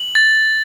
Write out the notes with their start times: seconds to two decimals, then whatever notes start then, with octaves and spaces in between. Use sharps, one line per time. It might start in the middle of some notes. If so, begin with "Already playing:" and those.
Already playing: F#7
0.15 A6